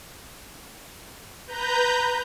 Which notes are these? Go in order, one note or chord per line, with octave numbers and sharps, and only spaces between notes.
B4 A#5 G6